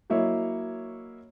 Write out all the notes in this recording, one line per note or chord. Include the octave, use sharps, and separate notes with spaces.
F#3 A#3 E4 C#5 D#5